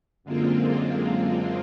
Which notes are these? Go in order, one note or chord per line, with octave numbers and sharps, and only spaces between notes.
F#2 D3 G#3 A#3 C4 F4